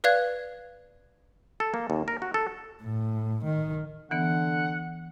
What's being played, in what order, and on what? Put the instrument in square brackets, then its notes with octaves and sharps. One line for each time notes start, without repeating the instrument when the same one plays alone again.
[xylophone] B4 D5 F5 F#6 G#6
[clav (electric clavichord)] A4
A#3
D#2
A#4
F#4
A4
[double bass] A2
D#3
[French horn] D3 [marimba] E3 B3 [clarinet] F#5